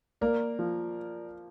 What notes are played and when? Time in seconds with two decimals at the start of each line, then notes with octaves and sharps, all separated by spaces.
0.21 A#3 A#4 D5
0.59 F3